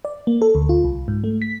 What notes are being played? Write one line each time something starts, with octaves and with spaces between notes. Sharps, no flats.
D5
A#3
A4
D2
F4
C2
G#2
A3
B6